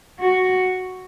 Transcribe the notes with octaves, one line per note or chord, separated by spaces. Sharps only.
F#4